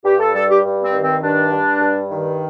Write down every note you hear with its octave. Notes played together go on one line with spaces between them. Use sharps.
G2 G4
A4
G3 A4
G4
G2
C4
D#3
C4
G2 D4
G3
G2
D#3